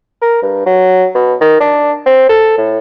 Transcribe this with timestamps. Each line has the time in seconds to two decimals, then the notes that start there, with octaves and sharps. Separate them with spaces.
0.22 A#4
0.42 G2
0.66 F#3
1.15 B2
1.41 D#3
1.60 D4
2.06 C4
2.29 A4
2.58 A2